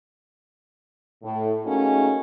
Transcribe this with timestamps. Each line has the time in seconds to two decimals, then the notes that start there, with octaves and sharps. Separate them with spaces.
1.22 A2
1.64 A3 A#3 C#4 D#4 F#4 G#4